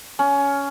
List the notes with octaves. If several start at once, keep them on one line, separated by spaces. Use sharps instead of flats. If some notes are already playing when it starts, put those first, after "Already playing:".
C#4